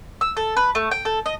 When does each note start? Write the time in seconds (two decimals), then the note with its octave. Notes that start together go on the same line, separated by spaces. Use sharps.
0.21 E6
0.37 A4
0.57 B4
0.75 A3
0.91 G5
1.05 A4
1.26 D#5